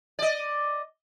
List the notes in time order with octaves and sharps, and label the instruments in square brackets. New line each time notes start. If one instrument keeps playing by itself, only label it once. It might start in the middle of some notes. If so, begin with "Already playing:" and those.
[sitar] D5 D#5